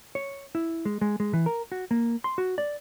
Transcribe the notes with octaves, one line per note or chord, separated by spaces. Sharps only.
C#5
E4
G#3
G#3
G#3
E3
A#4
F#4
A#3
C6
F#4
D5